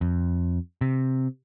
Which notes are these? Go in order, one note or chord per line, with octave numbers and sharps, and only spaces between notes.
F2
C3